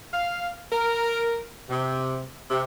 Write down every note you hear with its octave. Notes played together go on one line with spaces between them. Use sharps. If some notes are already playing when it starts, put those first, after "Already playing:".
F5
A#4
C3
C3